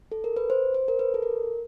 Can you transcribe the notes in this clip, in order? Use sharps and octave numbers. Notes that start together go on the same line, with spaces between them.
A4
A#4
B4
C5
C5
A#4
B4
A4
A#4